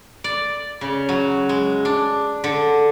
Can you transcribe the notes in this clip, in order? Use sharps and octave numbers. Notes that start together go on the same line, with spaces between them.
D5
C#3
F#3
G#3
D4
D3